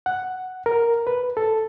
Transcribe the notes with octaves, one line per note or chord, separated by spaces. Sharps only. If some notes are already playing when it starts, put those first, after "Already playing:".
F#5
A#4
B4
A4